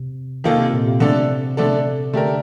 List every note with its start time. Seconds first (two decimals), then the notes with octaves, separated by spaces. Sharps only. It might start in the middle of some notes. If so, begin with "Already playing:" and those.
Already playing: C3
0.44 D#3 A#3 F4 A4
0.58 C3
0.73 A#2
0.87 C3
1.00 D3 A3 D4 A4
1.57 D3 A3 D4 A4
2.14 D3 A3 D4 G4 A#4